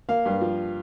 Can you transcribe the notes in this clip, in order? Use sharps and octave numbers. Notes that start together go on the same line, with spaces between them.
A#3 F5
G2
F3